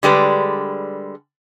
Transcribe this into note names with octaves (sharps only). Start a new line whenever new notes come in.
D3 G3 G#3 B4